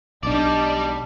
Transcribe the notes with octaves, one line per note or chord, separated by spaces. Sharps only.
B1 G3 D4 D#4 D5 A5